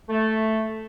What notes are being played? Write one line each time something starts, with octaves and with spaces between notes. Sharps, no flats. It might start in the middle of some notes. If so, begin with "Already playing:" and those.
A3